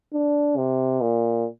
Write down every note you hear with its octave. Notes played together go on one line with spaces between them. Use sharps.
D4
C3
A#2